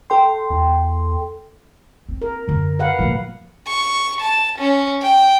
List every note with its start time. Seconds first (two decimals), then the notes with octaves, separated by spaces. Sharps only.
0.10 A4 G5 C6
0.50 E2
2.09 C4
2.22 A#4
2.48 F#2 D3
2.79 B4 F5 F#5
2.99 A#2 D3 F3 G3 A#3
3.67 C#6
4.21 A5
4.59 C#4
5.03 G5